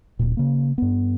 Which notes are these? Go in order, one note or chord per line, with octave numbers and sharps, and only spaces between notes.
D1 A#2
C#3 A#3
G2 B3